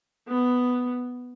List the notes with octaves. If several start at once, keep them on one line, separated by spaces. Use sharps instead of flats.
B3